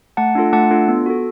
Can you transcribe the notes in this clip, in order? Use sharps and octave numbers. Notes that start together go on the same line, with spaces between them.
A3 F#5 A5
D4 F4 A4
A3 F#5 A5
D4 F4 A4
B3
F#4 A4